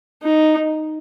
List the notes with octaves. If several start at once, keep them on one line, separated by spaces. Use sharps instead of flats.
D#4